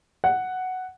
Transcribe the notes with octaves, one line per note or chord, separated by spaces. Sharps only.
F#5